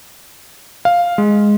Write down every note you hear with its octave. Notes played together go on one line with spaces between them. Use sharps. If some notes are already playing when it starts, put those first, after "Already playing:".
F5
G#3